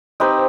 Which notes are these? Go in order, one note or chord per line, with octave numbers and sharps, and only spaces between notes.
C4 D#4 G4 B4